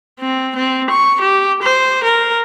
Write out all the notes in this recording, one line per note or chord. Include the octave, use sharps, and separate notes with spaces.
C4
C4
C#6
G4
C5
A#4